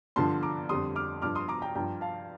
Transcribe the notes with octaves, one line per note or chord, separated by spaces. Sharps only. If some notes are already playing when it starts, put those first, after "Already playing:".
G2 D3 F3 A5 C6
A#5 D6
F2 D3 G3 C6 D#6
D6 F6
G2 F3 D6 F6
C6 D#6
A#5 D6
G5 A#5
G2 F3 G5 A#5
F5 A5